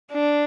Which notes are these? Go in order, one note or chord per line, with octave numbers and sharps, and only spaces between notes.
D4